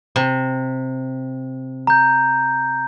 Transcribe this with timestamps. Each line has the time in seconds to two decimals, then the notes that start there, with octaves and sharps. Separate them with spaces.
0.16 C3
1.87 A#5 G6